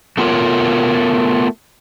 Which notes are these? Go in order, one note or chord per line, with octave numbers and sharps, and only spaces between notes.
A3 B3 F4 A#4 C#5